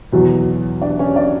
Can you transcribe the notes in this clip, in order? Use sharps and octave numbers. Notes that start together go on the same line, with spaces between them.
E2 B2 F#3
D4 D5
C#4 C#5
D4 D5